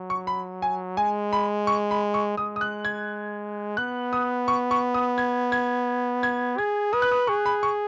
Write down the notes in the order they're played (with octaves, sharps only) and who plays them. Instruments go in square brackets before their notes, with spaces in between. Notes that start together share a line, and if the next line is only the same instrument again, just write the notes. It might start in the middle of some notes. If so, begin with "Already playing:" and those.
Already playing: [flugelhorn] F#3
[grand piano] C#6
B5
G#5
[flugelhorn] G#3 [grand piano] G#5
[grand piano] B5
C#6
B5
C#6
[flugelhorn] G#3 [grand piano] D#6
[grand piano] D#6
F#6
G#6
[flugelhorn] B3 [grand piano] F#6
[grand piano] D#6
C#6
C#6
D#6
G#6
G#6
G#6
[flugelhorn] G#4 [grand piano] G#6
[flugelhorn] B4 [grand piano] D#6
[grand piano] F#6
D#6
[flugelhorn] G#4 [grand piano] C#6
[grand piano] B5
C#6